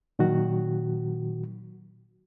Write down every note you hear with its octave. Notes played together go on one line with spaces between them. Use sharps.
A#2 D#3 F#3 F#4